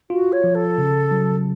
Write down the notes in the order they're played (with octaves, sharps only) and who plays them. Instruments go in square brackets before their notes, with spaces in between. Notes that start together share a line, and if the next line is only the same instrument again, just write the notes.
[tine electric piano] F4 [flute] F#4
[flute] C#5
[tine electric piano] F3
[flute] A4
[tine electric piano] C#3
F#3